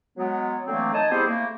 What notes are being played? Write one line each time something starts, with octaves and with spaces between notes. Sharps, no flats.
F#3 G#3 B3
D3 E3 F#3 A3 A#3 C4
D#4 D#5 G#5 A5
G3 B3 C4 E4 G#4 C5
A3 A#3